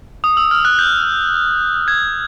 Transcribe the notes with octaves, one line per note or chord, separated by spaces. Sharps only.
D#6
E6
F6
F#6
G6
G#6